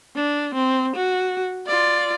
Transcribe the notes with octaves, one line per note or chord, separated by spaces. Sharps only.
D4
C4
F#4
F4 D5